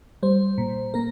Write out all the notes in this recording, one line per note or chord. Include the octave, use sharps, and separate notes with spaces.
G3 C5
A#2
A#3 A#4